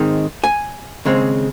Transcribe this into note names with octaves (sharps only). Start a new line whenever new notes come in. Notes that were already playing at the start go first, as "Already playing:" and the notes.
Already playing: G#2 D#3 G#3 C4
G#5
D#2 C#3 G#3 C4